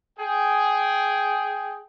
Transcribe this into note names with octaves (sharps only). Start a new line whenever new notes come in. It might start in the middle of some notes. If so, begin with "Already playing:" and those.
G#4 G5